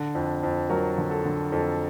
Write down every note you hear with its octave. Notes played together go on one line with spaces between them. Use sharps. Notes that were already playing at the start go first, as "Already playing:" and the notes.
Already playing: D3
F2
F2
F#3 A#4
D3
A4
D3
F2 A4